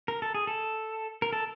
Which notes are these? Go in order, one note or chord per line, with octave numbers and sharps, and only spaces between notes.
A#4
A4
G#4
A4
A#4
A4